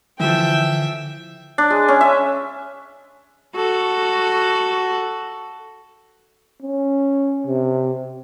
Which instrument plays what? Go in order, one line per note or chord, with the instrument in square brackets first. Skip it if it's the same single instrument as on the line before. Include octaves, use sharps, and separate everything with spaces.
[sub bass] D3 [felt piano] E3 F3 [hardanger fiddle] E5 [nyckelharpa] G5
[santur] D4
G#3
C#4
E5
[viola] F#4 A4
[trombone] C#4
C3